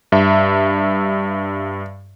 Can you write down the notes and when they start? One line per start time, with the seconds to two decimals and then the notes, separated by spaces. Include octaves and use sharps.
0.12 G2 E5